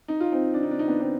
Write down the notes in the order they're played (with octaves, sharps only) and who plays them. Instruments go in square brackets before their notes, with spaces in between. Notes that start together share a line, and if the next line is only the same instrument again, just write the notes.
[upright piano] D#4
F4
C4 D#4
D4
D#4
D4
D#4
B3 D4
C4 D#4